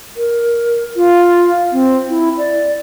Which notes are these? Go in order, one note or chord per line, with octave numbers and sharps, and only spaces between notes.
A#4
F4
C4
E4
D5